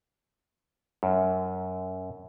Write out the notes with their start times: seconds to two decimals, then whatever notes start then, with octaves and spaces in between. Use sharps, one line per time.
1.03 F#2